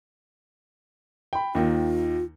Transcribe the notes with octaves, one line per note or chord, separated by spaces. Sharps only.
G5 B5
D#2 D#3 F4